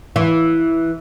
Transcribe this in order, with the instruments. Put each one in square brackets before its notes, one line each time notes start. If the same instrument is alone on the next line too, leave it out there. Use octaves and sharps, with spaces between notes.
[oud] E3